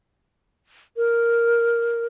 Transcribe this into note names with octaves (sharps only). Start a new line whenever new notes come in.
A#4